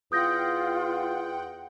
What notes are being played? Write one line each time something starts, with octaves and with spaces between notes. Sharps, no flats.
E2 F4 F#5 G5 D#6 G6 A#6